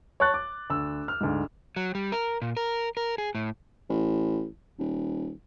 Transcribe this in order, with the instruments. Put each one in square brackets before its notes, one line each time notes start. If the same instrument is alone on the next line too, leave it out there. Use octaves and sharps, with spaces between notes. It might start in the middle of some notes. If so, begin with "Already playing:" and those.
[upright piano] C#5 A5 C#6 F#6 A6
D6
D2 E6
F6
D2 G#2
[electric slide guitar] F#3
G3
A#4
A#2
A#4
A#4
G#4
A2
[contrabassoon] A1
D#1